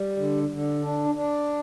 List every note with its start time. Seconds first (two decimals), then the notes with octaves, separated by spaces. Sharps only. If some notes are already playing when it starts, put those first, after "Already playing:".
Already playing: G3
0.17 D3
0.49 D3
0.82 D4
1.15 D4